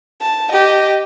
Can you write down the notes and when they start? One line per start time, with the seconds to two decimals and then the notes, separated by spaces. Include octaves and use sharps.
0.21 A5
0.52 G4 D#5